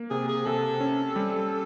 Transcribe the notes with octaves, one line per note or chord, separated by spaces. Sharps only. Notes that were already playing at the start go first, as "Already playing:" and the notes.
Already playing: A#3
C3 G#4
G#4
C3 A4
C#4
G3